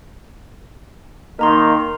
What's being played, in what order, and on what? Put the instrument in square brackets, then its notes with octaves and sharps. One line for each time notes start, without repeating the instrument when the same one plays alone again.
[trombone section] D#3 A#3 D#4 [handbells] A#4 A#5 C6